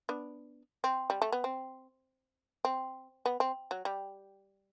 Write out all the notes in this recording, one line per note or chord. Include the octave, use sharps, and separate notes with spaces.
B3 D4
C4
G3
A3
B3
C4
C4
B3
C4
F#3
G3